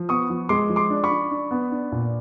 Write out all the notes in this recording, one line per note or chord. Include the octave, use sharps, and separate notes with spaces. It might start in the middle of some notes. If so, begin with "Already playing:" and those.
Already playing: F3
B3 C#6 D#6
F3
G#3 C6 D6
F3
C6 D6
D4
B5 C#6
D4
D4
B3
D4
A#2